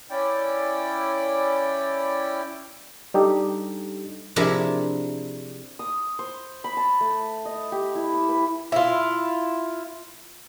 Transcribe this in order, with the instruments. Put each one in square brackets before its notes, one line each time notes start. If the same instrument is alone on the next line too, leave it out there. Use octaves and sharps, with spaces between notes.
[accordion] C#4 E4 D5 G5
[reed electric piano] G3 D4 D#4 G4 A4
[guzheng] C3 F3 D4 E4 G#4 A#4
[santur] D#6
C5
B5
A5
A3
D#5
G4
E4
E6
B4
[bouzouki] E4 F4